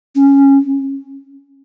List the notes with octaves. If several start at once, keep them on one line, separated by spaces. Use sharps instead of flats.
C#4